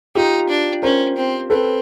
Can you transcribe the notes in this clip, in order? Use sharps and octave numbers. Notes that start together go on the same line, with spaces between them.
D#4 F4 G4
D4
C#4 A#4 C5
C4
C4 A4 B4